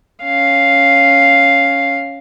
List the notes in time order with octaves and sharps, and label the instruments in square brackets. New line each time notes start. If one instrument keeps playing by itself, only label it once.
[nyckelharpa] C#4 F5